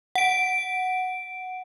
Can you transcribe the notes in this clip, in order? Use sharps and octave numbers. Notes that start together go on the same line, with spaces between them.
F#5 D7